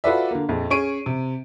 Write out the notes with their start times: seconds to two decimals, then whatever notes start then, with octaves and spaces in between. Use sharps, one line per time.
0.04 F4 F#4 A4 B4 D5 E5
0.31 D3 A#3
0.49 A#1 F2
0.70 C#4 G#4 C#6 D7 D#7
1.06 C3